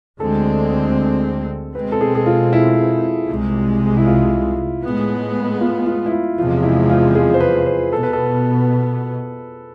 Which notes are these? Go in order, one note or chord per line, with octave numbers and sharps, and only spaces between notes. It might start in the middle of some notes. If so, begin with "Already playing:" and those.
D2 D3 G#3 C4 A4
B2 G#3 C4 B4
A4
G#4
G#4
F4
E4
C2 C3 G#3
E4
F4
A2 G#3 B3
F4
F4
E4
F4
E2 C3 F3 G#3 F4
E4
F4
G#4
C5
B4
C5
B2 B3 A4
B4
A4